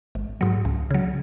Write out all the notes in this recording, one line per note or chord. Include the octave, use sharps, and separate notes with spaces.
G#1
G#2 F#3
C#2
C#3 F#3